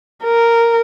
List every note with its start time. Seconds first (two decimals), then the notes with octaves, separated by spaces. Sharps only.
0.24 A#4